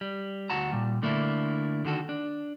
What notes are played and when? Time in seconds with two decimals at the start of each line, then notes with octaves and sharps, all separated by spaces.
0.01 G3
0.50 D2 F#4 F#5 A5 A#5
0.72 A#2 G3
1.02 D3 A3 A#3 D4 E4
1.85 D3 D#3 F#4 A4
2.09 D4